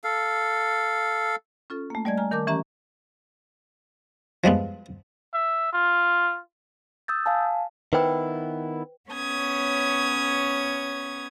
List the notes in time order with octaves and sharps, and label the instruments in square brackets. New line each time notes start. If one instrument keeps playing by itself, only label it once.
[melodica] A4 F5
[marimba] C#4 F4 A4
A3 A#3
G3 A3 D5 D#5 G#5 G#6
G#5 A#5 F6
D#3 A#4 A5 D6 G6
E3 C#4 G4 E5 A#5
[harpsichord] F3 G3 G#3 B3
[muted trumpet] E5
F4
[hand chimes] D#6 E6 G6 A6
F5 G#5 A5
[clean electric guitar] D#3 B3 E4 [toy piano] B4 C5 G5
[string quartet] B3 C#4 C#5 D#6 G#6